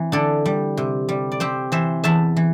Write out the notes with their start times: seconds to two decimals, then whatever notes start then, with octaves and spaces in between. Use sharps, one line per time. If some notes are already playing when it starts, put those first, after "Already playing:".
Already playing: E3 C4
0.12 D3 A4 D5
0.46 G3
0.77 C3
1.09 G3
1.32 D5
1.40 C4 G4 C5
1.72 E3 C5 E5
2.04 E2 E5 A5
2.36 E3